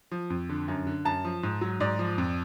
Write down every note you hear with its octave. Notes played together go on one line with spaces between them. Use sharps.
F3
F2
D3
F#2
D3
F#2 A5
F3
G#2
F#3
G#2 D5
F3
F2